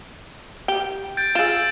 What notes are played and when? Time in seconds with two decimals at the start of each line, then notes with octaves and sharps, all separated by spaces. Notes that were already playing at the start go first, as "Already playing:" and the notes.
0.68 G4
1.17 G6 A6 D7
1.35 F4 G#4 E6 A6 E7